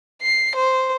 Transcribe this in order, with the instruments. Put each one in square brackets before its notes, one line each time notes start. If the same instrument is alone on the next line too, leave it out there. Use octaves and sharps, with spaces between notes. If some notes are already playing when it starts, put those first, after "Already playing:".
[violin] C7
C5